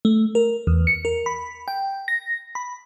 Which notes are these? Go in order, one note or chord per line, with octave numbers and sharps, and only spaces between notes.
A3
A#4
E2
C#7
A#4
B5
G5
A#6
B5